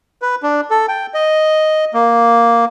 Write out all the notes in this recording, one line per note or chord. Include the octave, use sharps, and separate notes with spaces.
B4
D4
A4
G5
D#5
A#3